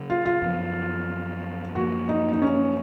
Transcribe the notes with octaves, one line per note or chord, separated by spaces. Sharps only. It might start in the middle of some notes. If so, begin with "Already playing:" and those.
Already playing: C#3 F#3 C#4
F4
F4
F#2 F3 B3
F#2 F3 A#3 F#4
D#4
D#4
C#4